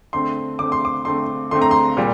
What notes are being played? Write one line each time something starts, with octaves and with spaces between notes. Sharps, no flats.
D3 A3 C4 C6
D3 A3 C4 D6
C6
D6
D3 A3 C4 C6
D3 A3 C4 C6
A#5
C6
A#2 G3